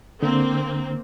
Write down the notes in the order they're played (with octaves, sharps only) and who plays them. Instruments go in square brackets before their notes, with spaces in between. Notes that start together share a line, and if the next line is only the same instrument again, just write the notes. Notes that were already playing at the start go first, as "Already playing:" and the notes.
[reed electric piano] D3 [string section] A#3 C4